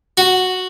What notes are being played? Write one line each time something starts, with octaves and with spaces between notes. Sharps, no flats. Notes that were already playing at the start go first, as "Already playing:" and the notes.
F#4